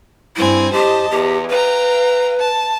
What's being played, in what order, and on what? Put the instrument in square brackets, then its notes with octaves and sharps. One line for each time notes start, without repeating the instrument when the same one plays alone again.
[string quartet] G2 C4 G#5 [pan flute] E4
[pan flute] G4 [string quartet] C5 D#5 A5
[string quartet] E2 [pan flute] G4
[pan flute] B4 [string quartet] F5 G5 A#5
[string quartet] A5